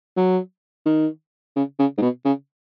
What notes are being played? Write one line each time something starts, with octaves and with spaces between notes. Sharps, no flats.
F#3
D#3
C#3
C#3
G#2
B2
C#3